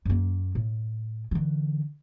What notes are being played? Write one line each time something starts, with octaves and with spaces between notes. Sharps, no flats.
F#2 A#3
A2
D3 E3